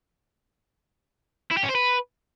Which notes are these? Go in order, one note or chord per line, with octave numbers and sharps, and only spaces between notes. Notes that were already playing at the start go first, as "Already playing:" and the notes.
E4
G4
C#4
C5
B4